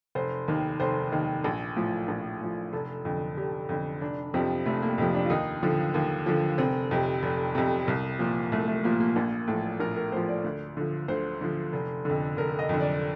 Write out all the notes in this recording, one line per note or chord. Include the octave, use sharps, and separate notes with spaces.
F1 C5
D#2 D#3
F1 C5
D#2 D#3
A#1
A2 F3
A#1
A2 F3
F1 A4
F2 D3
F1 G4
F2 D3
F1 D4
F2 C3 F3 C4
F1 A3
A#3
F2 C3 F3
D4
F4
D#2 D#4
D3 F3
D#2
D3 F3
F1 C4
F2 C3
F1
F2 C3
C2
A#2 F3
C2 A3
A3
A#2 F3 A#3
A#3
A#1 A#3
A2 F3 A4
A#1 A#4
A#4
A2 F3 C5
D5
D2
D3 F3
D2 C5
D3 F3
F1
F2 D3
F1 A#4
D#5
F2 D3
D5